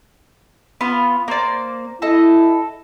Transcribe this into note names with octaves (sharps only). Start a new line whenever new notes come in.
B3 F4
A#3 C5 D5
E4 A4 D#5